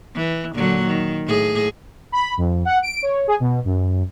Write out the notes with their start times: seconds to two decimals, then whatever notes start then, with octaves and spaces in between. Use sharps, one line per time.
0.15 E3
0.54 A#2 D3 F#3
0.86 D#3
1.27 A2 G#4
2.12 B5
2.37 F2
2.65 F#5
2.83 D7
3.02 C#5
3.28 G#4
3.40 B2
3.65 F#2